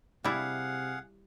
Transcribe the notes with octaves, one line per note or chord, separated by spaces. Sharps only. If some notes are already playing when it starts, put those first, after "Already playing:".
C3 G3 E4 G#4 F5 F#5